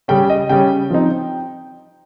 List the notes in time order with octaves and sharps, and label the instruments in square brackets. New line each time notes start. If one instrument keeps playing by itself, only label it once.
[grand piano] C#3 G3 C#4 G5
D#5
C#3 G3 C#4 G5
F3 C4 D#4